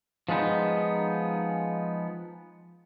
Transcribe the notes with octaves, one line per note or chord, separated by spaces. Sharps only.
F3 G#3 B3 D#4